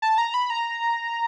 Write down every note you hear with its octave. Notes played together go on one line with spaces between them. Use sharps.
A5
A#5
B5
A#5